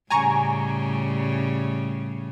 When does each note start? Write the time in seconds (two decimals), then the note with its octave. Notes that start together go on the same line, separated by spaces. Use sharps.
0.10 A2 C#3 G3 G#5 A#5 C#6